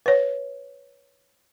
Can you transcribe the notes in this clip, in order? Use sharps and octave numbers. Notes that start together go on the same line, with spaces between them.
B4 C#5